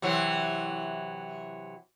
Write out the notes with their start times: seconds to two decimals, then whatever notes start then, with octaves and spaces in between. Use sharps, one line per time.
0.02 C3 E3 F#3